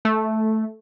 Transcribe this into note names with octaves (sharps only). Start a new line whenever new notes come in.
A3